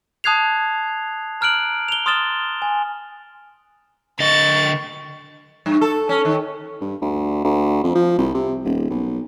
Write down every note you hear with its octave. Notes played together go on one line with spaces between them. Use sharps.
A5 D#6 F#6 G#6 C7 F7
A#5 F6 F#6 D7 F#7
F7 G7
C6 D#6 F6 A6 E7 G7
G#5
D3 D#5 C#6 A6
G2
A4
C#4
D#3
G2
D2
D2
F2
F3
C2
C3
D#1
B1